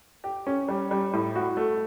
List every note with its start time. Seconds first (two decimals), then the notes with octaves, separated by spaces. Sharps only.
0.24 G4
0.47 C#4
0.68 G3
0.91 G3
1.13 A2
1.36 F#4
1.57 A3